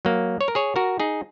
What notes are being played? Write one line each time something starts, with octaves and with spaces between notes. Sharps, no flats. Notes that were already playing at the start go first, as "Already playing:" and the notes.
F#3 A#3
C#5
A#4
G#4 C#5
F#4 A#4
D#4 G#4